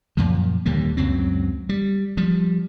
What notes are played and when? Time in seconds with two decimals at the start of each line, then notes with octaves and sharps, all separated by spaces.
0.17 F#2 A#2 F3
0.66 D#2 D3 G3 A#3
0.97 C#2 F#2 F#3 C4
1.69 G3
2.17 F3 G3